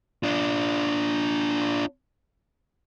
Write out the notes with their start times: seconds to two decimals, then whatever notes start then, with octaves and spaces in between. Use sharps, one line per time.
0.23 D4 F4